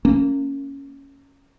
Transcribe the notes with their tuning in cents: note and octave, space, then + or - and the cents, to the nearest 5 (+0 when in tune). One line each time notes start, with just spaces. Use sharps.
A#3 -25 C#4 +0